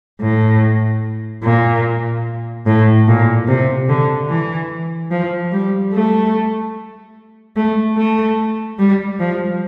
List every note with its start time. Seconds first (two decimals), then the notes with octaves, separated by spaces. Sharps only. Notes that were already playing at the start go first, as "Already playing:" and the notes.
0.22 A2
1.44 A#2
2.67 A2
3.08 A#2
3.48 C3
3.89 D3
4.29 E3
5.11 F3
5.52 G3
5.93 A3
7.56 A3
7.97 A3
8.79 G3
9.20 F3